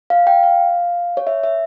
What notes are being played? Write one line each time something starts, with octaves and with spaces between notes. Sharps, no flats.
F5
G5
F5
C#5
E5
E5